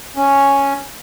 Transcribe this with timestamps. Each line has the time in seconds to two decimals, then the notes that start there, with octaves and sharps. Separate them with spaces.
0.16 C#4